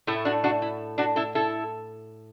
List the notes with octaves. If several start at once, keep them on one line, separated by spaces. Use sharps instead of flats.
A2 A3 E4
D4 F#4
D4 F#4
E4
D4 F#4
E4 A4
E4 A4